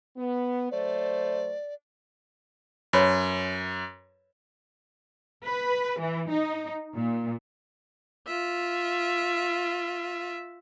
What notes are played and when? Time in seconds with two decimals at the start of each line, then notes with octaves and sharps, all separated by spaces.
0.17 B3
0.71 F#3 A3 C5 D5
2.93 F#2 B4 C#5 B5
5.45 B4
6.00 E3
6.29 D#4
6.95 A#2
8.27 F4 E5